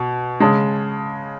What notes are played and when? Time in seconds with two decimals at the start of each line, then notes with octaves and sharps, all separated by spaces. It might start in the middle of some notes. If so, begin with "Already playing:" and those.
Already playing: B2
0.40 C#3 G#3 A5